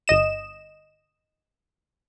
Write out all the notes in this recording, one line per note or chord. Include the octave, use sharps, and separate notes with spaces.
G1 D#5 E7